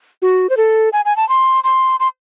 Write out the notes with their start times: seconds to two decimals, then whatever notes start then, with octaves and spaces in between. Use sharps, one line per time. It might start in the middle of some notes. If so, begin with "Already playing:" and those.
0.22 F#4
0.50 C5
0.57 A4
0.93 G#5
1.05 G#5
1.16 A5
1.29 C6
1.64 C6
2.00 C6